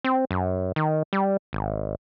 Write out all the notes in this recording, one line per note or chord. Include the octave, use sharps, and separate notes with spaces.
C4
F#2
D#3
G3
G#1